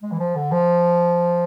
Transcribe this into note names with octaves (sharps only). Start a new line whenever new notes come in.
G#3
E3
F3
D3
F3